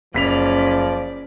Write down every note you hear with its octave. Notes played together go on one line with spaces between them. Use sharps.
F#1 F3 C#4 D5 B6 F7